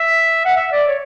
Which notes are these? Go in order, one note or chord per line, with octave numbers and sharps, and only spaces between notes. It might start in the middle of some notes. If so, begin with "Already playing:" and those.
Already playing: E5
F#5
E5
D5
C#5